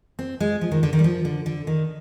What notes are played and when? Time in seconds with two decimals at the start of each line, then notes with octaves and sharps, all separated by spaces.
0.19 C4
0.40 G#3
0.61 F3
0.72 D#3
0.83 D3
0.93 D#3
0.99 G3
1.04 F3
1.25 D3
1.46 D3
1.67 D#3